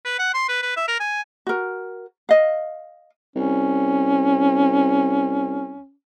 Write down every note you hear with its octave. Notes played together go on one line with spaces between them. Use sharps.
B4
F#5
C6
B4
B4
E5
A#4
G#5
F#4 A#4
D#5 F5
C2 C#4